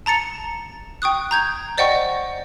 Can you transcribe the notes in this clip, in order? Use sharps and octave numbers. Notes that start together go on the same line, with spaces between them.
A5 A#5 A6 C#7
G5 C#6 D#6 F#6
A#5 G6 G#6
C5 D5 D#5 F#5 G5 C#6